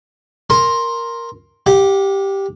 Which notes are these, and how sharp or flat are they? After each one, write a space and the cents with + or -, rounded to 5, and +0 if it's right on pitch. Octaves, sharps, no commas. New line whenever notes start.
A#4 +0 C6 +10
G4 +0 F#5 -45